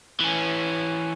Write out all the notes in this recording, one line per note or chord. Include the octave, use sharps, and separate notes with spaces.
E3 C#4